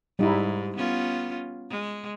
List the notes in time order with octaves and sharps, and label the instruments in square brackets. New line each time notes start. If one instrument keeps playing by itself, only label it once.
[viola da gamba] G#2 [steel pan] G3 D#4 E4
[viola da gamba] B3 C#4 F4
G#3